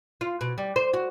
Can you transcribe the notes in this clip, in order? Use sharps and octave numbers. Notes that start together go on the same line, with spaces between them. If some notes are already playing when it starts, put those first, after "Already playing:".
F4
B2
G3
C5
F#4